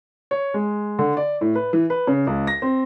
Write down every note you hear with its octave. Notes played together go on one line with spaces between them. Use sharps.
C#5
G#3
D3
D5
A2
B4
E3
B4
C#3
C#2
A#6
C4